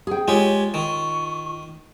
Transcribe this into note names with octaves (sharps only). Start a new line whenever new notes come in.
G#4 G5
G#3 F4 G4 C#5
D#3 C#6